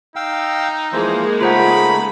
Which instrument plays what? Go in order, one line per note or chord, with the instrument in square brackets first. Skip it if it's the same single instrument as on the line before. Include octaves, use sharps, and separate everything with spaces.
[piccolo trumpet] D#4 [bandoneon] F5 G5 E6
[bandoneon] E3 F3 C5 [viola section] G#3 A#3 G#4
[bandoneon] C#3 A3 D#4 [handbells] F4 C5 F#5 [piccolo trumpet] B5